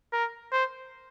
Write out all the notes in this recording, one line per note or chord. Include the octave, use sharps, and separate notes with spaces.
A#4
C5